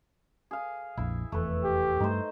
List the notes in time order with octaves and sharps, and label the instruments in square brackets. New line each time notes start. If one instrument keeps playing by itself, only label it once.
[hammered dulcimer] G#4 F5
[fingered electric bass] A#1 F2 [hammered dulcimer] E4
[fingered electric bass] F1 E2 [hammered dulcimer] A3 B4
[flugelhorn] G4
[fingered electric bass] G2 G3 A3 [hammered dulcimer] D#4 C5